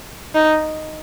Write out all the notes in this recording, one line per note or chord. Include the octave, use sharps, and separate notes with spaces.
D#4